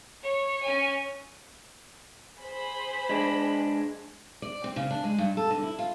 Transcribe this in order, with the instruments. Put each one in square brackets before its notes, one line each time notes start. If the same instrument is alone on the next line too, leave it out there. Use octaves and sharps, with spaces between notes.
[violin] C#5
C#4 G#5
[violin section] G#4 C5 B5
[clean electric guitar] G#3 D4
[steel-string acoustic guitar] D5
C4
C#3
D4
G#3
G2
A4
D3
E4
F4